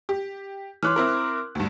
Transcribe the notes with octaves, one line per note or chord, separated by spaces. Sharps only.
G4
E3 C#5 C6 D6 F6 F#6
C4 E4 A#4
D2 G2